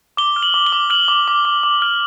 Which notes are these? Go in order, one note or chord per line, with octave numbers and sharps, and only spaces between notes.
D6 G7
F6
F#7
D6
G7
D6
F6 F#7
D6
D6
D6
D6
F6